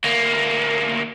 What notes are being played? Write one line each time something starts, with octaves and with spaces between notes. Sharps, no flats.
D2 A#3